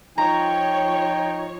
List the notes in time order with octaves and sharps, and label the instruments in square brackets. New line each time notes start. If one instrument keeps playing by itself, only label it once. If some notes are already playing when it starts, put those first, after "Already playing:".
[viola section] F3 C#5 [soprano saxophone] D#4 [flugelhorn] G5 [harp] A#5